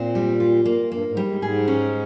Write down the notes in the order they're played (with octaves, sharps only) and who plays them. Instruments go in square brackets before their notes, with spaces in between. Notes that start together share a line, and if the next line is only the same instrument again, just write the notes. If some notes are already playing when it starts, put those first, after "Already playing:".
Already playing: [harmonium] A#2 [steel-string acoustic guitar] C4
[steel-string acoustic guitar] G3
F4
A#3
[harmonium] G2 [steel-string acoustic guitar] A#3
[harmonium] G#2
[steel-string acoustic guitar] G3
[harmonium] G#2
[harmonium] G#2 [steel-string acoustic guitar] G#4
[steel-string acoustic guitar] C#4